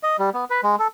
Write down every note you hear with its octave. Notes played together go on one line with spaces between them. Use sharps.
D#5
G3
B3
B4
G#3
A4